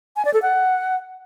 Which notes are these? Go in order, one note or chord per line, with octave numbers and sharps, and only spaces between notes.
G#5
D5
A4
F#5